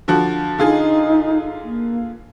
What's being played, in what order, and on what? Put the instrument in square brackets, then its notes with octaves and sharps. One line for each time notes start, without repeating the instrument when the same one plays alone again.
[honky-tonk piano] D3 F3 F#4
[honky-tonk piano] D3 F4 G#4 [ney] D#4
[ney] A#3